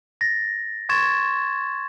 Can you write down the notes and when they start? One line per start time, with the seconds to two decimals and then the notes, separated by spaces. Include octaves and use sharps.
0.21 A6 A#6
0.89 C6 C#6 G#6 A6 E7